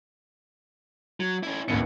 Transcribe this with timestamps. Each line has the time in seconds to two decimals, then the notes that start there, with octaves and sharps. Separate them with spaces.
1.20 F#3
1.43 C#4 E4
1.68 A1 D#2 B2 E3 C#7